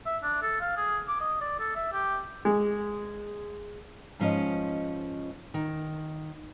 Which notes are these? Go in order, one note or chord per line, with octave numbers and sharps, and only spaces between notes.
E5
D4
A4
F5
G#4
D6
D#5
D5
A4
E5
G4
G#3
G#2 F3 C#4 D#5
D#3